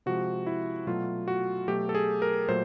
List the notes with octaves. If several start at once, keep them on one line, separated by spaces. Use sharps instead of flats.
C3 F3 G#3 F#4
E4
B2 F#3 A3 F4
F#4
B2 F#3 A3 G4
A4
G#4
A#4
A#2 F#3 A3 C5